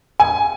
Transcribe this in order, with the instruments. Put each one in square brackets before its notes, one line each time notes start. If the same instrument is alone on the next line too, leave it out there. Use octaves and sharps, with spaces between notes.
[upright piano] G#5